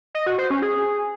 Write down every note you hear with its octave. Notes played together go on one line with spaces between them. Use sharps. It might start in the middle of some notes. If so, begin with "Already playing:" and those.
D#5
F#4
C5
C#4
G#4